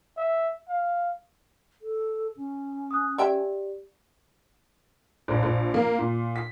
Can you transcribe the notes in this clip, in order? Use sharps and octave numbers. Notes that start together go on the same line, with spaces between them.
E5
F5
A4
C#4
D#6 F#6
G4 C#5 D5 E5 G5
A#1
A#1
A#3
A#2
B6